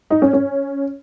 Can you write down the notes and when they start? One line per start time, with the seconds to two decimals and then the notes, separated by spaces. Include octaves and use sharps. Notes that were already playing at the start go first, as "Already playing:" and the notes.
0.10 D#4
0.22 C#4
0.33 C#4